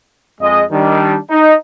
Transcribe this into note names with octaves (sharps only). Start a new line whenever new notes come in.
F2 G#3 D#5
D#3 G3 D4
D#4